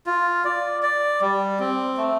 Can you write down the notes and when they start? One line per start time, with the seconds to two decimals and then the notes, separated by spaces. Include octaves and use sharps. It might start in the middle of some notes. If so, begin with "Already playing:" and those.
0.06 F4
0.44 D5
0.83 D5
1.21 G3
1.59 C4
1.97 A3